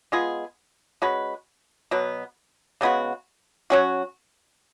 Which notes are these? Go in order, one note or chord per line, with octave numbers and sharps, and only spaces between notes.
G#3 B3 F4 G#4
G#3 C#4 F#4 B4
B2 F#3 B3
C#3 G#3 B3 F#4
F#3 C#4 F#4